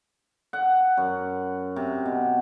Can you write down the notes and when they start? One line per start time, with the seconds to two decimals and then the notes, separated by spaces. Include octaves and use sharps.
0.53 F#5
0.97 F#2
1.76 C3
2.06 B2